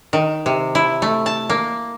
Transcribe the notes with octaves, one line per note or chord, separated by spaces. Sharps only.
D#3
C3
E4
A3
A5
A#3